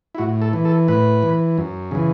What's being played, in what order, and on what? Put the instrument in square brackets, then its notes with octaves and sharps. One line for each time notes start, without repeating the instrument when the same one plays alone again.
[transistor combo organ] E4
A2 F#4
A4
E3
A4
A2 B4
E3
F#2
C#3 E3